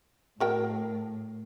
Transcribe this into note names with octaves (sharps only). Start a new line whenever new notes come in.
A2 F#4 A#4 G5